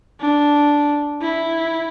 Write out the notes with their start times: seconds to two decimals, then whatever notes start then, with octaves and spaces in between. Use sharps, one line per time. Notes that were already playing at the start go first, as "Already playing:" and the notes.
0.20 D4
1.21 E4